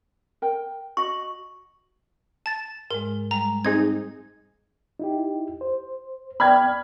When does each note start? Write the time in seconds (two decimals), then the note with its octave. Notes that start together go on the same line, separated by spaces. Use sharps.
0.42 A#4 G5
0.97 F#4 D#5 C#6
2.46 A5 A6
2.91 G#2 G#3 A#4
3.31 G3 G#3 A#5
3.65 C4 D#4 G#4 G#6
5.00 D#4 E4 G4
5.61 C5
6.40 B3 D5 G5 B5 F6 G#6